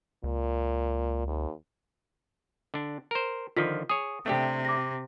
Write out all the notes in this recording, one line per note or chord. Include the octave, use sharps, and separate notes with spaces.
C#2 A#2
D#2
D3 D4
A#4 C5
D3 D#3 F3 F4 B6
G#4 C#5 D#6
C3 A3 D4 G4
D6 A#6